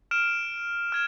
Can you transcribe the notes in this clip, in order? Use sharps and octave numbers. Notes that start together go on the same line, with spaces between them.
F6 D7 E7
F6 G#6 E7